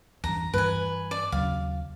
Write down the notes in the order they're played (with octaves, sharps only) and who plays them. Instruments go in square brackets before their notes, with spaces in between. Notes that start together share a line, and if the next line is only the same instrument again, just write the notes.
[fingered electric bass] E2 G2 [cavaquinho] A#5
[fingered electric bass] G2 E3 [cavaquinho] B4 G#5
[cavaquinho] D5
[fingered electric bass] D#2 C#3 F#3 [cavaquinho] F5